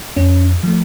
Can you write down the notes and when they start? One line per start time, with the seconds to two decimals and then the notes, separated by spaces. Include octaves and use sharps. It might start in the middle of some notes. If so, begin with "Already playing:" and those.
0.16 F2 C#4
0.63 F3 A3